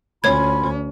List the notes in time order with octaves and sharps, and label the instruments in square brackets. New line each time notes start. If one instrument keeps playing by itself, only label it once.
[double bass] D2 C#4 [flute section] F4 B5 [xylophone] C#5 G#6